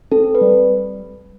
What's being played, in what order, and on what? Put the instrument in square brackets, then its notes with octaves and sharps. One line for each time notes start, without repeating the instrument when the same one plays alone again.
[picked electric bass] C4 [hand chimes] A4
[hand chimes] B4
[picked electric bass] G3